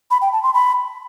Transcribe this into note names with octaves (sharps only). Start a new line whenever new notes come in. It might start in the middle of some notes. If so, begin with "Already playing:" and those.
B5
G5
A5
C6
B5